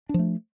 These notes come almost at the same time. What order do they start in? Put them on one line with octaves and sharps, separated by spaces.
D4 F3 A3